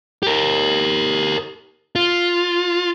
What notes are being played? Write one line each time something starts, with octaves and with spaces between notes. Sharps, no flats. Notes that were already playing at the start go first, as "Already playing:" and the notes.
G4 A#4
F4